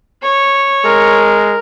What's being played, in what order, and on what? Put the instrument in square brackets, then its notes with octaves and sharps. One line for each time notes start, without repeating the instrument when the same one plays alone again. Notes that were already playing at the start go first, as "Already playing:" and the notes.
[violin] C#5
[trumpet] G#3 [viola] A#4